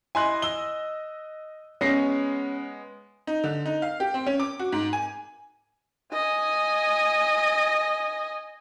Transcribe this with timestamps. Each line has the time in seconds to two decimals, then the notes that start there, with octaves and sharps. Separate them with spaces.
0.15 E4 D#5 G#5 C6 F#6
0.42 D#5 E6 G7
1.81 G#3 B3 C#4 A#6 C7
3.27 D#4
3.44 D3
3.65 D#4
3.82 F5
4.00 G4
4.14 C4
4.26 C#4
4.40 D6
4.59 F#4
4.72 G#2
4.93 G#5
6.12 D#5 G#5